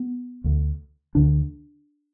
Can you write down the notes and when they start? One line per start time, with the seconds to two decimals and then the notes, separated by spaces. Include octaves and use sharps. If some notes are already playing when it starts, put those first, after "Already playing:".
Already playing: B3
0.44 D2 D3
1.15 D2 D3 D4